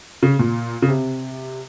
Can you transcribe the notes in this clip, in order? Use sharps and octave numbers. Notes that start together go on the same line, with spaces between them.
C#3
A#2
C#3
C3